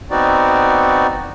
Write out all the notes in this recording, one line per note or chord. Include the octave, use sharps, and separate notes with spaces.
B3 C4 D#4 F#4 D5